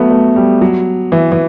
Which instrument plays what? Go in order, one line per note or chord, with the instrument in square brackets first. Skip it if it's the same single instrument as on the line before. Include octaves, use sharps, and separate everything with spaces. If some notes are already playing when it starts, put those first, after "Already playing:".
Already playing: [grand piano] F#3 A3 B3
A3
G3
F#3
E3
E3